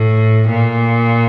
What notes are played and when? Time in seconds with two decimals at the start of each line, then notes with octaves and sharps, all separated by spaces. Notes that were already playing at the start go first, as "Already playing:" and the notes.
Already playing: A2
0.50 A#2